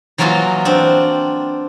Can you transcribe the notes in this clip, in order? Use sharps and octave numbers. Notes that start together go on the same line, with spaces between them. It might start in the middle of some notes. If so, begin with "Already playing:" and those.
E3 F#3 A#3 F4 F#4 D#5
C4 D4